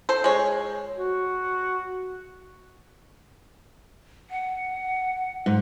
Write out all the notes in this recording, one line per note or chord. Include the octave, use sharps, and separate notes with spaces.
A4 C5
G#3 C#5
F#4
F#5
G#2